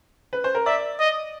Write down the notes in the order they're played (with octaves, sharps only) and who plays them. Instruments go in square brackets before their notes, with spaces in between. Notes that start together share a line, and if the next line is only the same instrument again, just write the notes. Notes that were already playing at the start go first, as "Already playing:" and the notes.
[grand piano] B4
C5
A#4
[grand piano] D5 [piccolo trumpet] E5
[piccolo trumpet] D#5